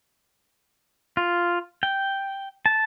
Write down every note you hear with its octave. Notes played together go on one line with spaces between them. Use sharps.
F4
G5
A5